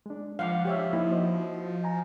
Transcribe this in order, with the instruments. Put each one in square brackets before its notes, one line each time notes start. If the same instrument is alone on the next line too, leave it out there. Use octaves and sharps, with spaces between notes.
[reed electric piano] G#3 D4
[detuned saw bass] F3 [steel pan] F5 F#5 D6
[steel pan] G4 C#5 E5
[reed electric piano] A#3 D#4 [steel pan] E4
[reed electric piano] F#4 C5 D#5
G#5 A#5